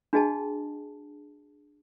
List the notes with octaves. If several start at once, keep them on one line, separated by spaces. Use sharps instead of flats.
D4 F#4 G#4 D#5 G5 A5